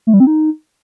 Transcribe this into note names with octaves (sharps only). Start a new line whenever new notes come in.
A3
G3
C4
D#4